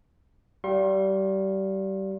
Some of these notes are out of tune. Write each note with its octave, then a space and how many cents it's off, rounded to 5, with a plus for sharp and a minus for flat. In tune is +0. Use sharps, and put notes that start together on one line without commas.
G3 -25 F5 +0 C6 +40